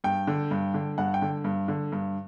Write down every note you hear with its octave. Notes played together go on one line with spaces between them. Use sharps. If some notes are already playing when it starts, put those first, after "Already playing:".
G2 G5
D3
G2
D3
G2 F#5
G5
D3
G2
D3
G2